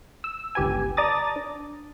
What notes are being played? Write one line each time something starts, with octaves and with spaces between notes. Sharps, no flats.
E6
G1 C#2 G4 B4 G#5
D5 A5 A#5 D6 D#6 A6
D4